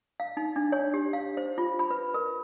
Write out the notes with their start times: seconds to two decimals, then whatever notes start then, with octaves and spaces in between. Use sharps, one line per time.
0.20 F5
0.37 D#4
0.56 D4
0.72 C#5
0.94 G4
1.13 F5
1.37 C5
1.58 F4
1.79 B5
1.91 B4
2.14 A#4